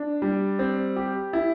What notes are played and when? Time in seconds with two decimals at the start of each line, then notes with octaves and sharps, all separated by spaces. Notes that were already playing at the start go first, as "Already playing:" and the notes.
Already playing: D4
0.22 G3
0.59 C4
0.96 G4
1.33 E4